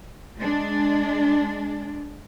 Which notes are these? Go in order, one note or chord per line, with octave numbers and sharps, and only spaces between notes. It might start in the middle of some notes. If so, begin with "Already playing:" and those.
G#3 D4